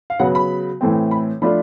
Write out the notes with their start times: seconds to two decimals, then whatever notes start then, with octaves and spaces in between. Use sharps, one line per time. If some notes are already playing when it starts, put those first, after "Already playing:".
0.10 F5
0.19 C#3 F#3 B3 F#5
0.35 B5
0.81 A2 E3 A3 C4
1.11 B5
1.42 F3 A3 D4 F4 B5